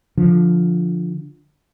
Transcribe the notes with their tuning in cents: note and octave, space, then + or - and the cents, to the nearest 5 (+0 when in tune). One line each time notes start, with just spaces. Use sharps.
D3 +0 F3 +0